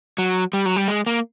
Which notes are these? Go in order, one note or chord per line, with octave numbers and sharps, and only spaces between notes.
F#3
G3
F#3
G3
G#3
A#3